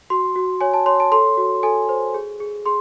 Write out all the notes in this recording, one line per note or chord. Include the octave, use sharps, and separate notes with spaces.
F#4 C6
F#4
C#5 G#5
A5
C#5 C6
A5
A4 C6
F#4
A4 G#5
C5
G#4
G#4
G#4 C6